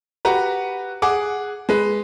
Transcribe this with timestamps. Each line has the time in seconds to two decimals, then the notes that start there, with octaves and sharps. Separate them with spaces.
0.25 F#4 G4 B4 A#5
1.02 G#4 F#5 D6
1.69 G#3 B4